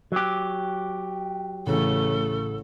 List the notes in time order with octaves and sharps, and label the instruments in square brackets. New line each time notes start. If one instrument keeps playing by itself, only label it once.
[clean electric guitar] F#3 G4
[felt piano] A1 [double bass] C#3 A3 [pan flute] A4